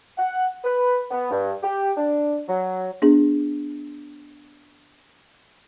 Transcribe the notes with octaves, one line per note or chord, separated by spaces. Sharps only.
F#5
B4
B3
G2
G4
D4
F#3
B3 D4 G#4